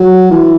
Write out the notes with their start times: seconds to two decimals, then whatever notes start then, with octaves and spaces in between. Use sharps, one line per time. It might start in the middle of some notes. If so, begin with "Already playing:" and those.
Already playing: F#3
0.31 E3